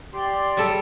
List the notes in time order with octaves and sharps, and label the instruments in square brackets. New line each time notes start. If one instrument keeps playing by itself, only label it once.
[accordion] G4 D5 C6
[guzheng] G3 A4